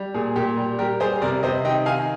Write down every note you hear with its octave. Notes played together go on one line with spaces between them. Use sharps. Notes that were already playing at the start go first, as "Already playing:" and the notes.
Already playing: G3
A#2 G#4
A#2 G4
G3
G3 G4 A#4
G3 G#4 C5
C3 A#4 D5
C3 C5 D#5
D#3 D#5 G5
D#3 F5 G#5